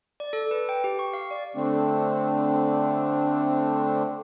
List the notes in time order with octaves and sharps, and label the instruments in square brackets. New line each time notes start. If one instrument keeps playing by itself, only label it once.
[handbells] D5
A4
B4
G5
G4
C#6
F5
D5
[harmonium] D3 A3 C4 D4